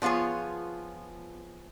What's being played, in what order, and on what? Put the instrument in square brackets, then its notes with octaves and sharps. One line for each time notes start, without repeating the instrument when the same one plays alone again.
[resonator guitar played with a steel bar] F3 B3 F4 G#4 C#5